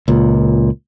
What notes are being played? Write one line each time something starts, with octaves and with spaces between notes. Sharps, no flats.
C#2 A#2